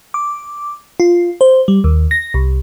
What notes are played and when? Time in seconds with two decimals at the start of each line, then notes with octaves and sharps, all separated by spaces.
0.14 D6
1.00 F4
1.41 C5
1.68 G3
1.84 D#2
2.11 A#6
2.34 C2